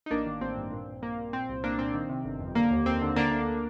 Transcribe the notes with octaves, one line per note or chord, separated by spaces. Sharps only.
D#4
A1 A#3 D4
D#3
A1 C4
G2
A#2
A#1
A#1 A#3
A#2
A#2 C4
C2
C2 A#3 D4
A#2 C4
D#3
C3
G1
F2
D3 A#3
D#2
D#2 C4
D3
D3 A#3 D4
D2